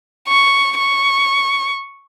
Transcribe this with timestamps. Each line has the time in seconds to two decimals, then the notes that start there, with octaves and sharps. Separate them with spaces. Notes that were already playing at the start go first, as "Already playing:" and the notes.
0.28 C#6
0.78 C#6